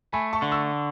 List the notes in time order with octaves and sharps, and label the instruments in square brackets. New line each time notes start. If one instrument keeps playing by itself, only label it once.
[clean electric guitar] A3 [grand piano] G#5 B5
[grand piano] A5 C#6
[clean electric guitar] D3
[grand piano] C#6 E6